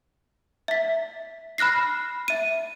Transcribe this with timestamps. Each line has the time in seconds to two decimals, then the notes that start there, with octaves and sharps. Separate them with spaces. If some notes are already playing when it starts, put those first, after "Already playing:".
0.68 E5 B6
1.58 B5 F6 F#6 A#6 C7
2.28 E5 D#7